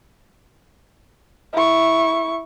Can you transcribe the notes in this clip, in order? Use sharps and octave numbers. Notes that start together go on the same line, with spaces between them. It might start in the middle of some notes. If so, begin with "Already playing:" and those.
E4 C#6